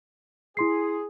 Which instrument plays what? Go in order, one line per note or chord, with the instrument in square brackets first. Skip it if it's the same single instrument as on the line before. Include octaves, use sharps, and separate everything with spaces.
[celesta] E4 C6 C7 [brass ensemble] G#4